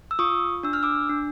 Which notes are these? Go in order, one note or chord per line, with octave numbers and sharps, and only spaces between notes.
E6
F4 C#6 D#6
D4 E6
F6
D6 E6
D4